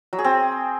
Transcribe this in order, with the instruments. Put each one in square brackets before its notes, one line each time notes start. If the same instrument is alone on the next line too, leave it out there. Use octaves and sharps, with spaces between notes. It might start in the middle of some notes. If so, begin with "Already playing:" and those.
[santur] F#3
G#4
C4